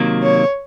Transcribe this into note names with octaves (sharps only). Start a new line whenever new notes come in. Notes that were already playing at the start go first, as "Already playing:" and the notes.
Already playing: C3 D#3 F#3 A#3
C#5